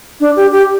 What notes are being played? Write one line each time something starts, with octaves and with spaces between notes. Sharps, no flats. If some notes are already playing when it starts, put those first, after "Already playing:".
D4
G4
G4